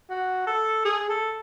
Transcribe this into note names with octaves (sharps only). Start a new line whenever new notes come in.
F#4
A4
G#4
A4